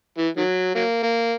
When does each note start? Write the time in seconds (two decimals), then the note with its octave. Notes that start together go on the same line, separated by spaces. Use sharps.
0.18 E3
0.37 D#3 F#3
0.75 F#3 A#3
1.03 A#3